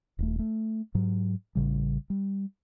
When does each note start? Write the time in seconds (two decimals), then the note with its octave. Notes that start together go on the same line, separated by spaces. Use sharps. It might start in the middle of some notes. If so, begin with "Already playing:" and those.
0.19 D#1 A3
0.39 A3
0.95 G#2 F#3
1.55 A1 C#3 G3
2.10 G3